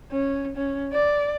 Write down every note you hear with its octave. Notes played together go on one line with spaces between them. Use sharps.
C#4
C#4
D5